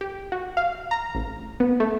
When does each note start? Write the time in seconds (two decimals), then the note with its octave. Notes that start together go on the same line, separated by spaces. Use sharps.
0.01 G4
0.32 F#4
0.57 F5
0.91 A#5
1.15 A1
1.60 B3
1.80 A3